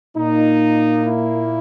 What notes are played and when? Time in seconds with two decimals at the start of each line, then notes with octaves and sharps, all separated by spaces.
0.16 A#2 A#3 D#4
1.07 E4